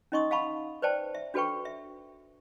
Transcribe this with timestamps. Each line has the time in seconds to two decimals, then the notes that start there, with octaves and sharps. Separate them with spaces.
0.12 C#4 D#4 D#5 C6 C#6 D#6
0.31 F5 F#5 A5 B5 C#6
0.82 B4 C5 D5 G5 A5
1.15 E5
1.34 D4 F#4 A4 B4 G5 C#6
1.65 E5